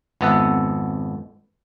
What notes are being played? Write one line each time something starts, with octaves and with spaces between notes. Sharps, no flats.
G#1 F2 B3 A4 E5 F#5